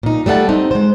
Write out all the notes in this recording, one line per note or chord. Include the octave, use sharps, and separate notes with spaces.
A#2 D#4
G3 A3 D#5 F#5 A5
C4 D#4
G#3 C5